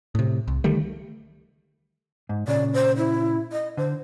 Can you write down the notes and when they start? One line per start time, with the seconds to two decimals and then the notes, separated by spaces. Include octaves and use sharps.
0.15 A2 C3
0.48 C2
0.64 D3 D#3 G3 A3
2.29 G#2
2.48 A#2 C#3 D5
2.74 C5
2.97 E4
3.52 D#5
3.77 D3 C5